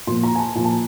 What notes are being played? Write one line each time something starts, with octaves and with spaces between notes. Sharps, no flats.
A#2 F3 C6
A#5
G#5
A5
A#2 F3 G#5
A5